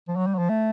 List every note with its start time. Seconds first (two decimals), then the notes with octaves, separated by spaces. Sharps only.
0.08 F3
0.16 F#3
0.27 G3
0.34 F#3
0.38 F3
0.49 A3